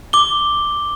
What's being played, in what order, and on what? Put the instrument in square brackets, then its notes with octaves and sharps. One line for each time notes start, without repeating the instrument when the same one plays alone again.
[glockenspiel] D6 G7